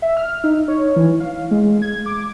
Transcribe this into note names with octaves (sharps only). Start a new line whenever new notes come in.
E5
F6
D#4
C#5
E3
F5
G#3
G#6
D6